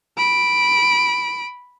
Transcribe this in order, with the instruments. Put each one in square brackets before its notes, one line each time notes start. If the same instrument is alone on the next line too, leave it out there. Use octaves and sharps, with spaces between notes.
[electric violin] B5 D7